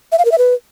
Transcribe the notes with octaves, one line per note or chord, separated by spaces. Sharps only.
E5
F5
A#4
E5
B4